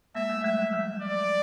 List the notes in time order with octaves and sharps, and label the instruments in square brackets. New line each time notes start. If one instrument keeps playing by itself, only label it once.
[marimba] G#3 A#3 [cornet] E5
[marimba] G3 A3
[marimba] F#3 G#3 [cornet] E5
[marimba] F#3 G#3
F3 G3
[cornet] D5